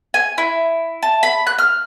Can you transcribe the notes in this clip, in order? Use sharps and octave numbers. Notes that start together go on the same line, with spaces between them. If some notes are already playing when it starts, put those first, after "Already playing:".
G#5
E4
A5
B5
F#6
F6